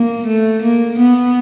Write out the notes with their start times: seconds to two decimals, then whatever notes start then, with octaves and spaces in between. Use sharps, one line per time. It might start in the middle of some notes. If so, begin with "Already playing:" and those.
Already playing: A#3
0.27 A3
0.63 A#3
1.00 B3